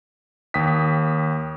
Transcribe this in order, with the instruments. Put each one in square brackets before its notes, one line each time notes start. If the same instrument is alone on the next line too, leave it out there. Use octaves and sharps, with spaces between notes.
[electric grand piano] D#2 G5 D#6 B6